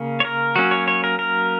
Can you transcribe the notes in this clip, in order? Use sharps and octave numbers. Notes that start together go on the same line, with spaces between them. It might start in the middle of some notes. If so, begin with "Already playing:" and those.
Already playing: C#3 A#3 C#4
C#5
A#4
F#3 A#3 C#4 F#4
C#5
C#5
A#4
A#4